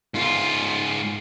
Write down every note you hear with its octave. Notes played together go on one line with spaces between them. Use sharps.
G#2 F4